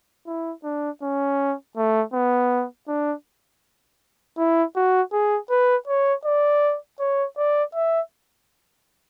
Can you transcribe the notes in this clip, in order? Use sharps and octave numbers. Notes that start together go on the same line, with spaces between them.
E4
D4
C#4
A3
B3
D4
E4
F#4
G#4
B4
C#5
D5
C#5
D5
E5